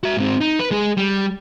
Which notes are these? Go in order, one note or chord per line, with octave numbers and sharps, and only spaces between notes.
F#4 E5
G#2 C4
D#4
B4
G#3 G#4
G3